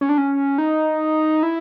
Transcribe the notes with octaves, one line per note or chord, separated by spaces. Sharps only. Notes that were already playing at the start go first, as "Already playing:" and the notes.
C#4
D4
C#4
D#4
E4